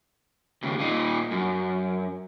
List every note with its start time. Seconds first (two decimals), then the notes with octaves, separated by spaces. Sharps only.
0.63 D#2 C#3
0.79 A#2 D#4
1.31 F#2